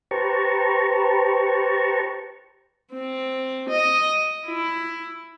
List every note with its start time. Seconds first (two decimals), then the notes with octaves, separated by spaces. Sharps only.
0.11 G4 B4 C5 A5 A#5 C#6
2.93 C4
3.69 D#5
4.46 E4